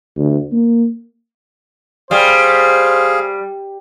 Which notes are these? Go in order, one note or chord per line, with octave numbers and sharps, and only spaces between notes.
D2
A#3
G3 G#4 C5 F5